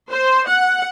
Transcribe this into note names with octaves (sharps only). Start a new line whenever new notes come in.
C5
F#5